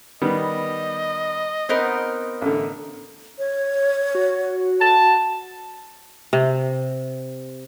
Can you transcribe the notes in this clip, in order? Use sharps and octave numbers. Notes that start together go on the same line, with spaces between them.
D#3 G3 B3 D#5
B3 C4 D#4 A#4
A1 D3
C#5
F#4
A5
C3